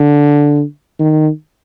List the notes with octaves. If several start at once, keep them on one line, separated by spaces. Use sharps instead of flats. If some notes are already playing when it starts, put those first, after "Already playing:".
Already playing: D3
D#3